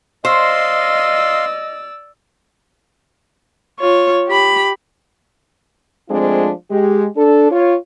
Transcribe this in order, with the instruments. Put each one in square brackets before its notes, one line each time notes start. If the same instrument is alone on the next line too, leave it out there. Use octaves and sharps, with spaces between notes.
[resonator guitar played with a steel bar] C5 [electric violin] D5 E6 [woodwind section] D#5 [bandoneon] F5 C6
[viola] F4 C#5
G4 B5
[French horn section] F3 G#3 A3 C4 D4 F4
G#3 G4
D4 A4
F4 C#5